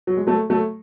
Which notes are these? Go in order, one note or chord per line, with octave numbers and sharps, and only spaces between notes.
F#3
G#3
F#3 A3
F#3 A3